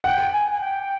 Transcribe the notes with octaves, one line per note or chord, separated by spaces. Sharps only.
F#5 G5
G#5
G#5
G5